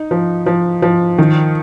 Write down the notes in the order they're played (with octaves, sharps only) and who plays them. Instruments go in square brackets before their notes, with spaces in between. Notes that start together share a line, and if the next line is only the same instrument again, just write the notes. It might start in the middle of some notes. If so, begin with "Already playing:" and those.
Already playing: [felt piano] D#4
F3
F3
F3
D#3